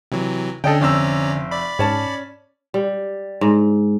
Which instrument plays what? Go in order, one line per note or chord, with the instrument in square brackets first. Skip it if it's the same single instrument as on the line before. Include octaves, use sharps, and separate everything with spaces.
[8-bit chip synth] C3 E3 F#3
[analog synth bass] D3 [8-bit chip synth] C#4 D4 [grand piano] A4 D#5 G5
[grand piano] F1 C4 E6 [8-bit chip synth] C#4 D5 A#5
[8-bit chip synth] D5 B5
[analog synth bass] G#2 [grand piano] C#4 A5
[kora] G3
G#2